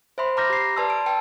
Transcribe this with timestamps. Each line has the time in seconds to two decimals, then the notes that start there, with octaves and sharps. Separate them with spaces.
0.18 C5 E5 B5 C6
0.37 A#5 B5 D6 F6 G6 A#6
0.50 G4 C7
0.77 B4 D5 A5 C6 E6
0.90 D7
1.06 B4 G5 A5